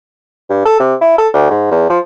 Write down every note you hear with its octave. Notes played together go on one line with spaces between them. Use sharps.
G2
A4
C3
E4
A4
D2
G#2
E2
F3